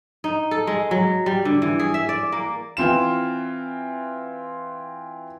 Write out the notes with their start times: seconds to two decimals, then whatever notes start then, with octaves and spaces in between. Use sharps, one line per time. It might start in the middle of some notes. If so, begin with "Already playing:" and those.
0.24 D#4
0.51 A4
0.67 G#3
0.91 F#3
1.26 G3
1.45 D3
1.62 E3
1.80 G#4
1.94 E5
2.09 D5
2.32 A#3
2.77 E3 C4 F4 E7